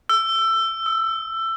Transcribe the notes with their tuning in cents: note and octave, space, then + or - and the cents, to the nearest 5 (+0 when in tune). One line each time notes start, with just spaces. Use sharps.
E6 +20
E6 -40